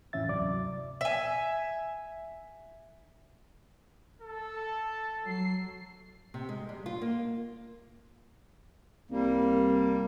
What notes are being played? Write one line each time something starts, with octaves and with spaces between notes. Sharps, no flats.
F2 A2 E3 C#4 E5 A6
D2 G2 C3 F#3 D5 D6
E5 G#5
A4
F#3 C7
C3
G#3
G3
F4
A#3
C2 G3 A#3